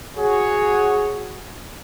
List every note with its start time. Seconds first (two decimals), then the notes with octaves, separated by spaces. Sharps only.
0.17 F#4 G#4 C#5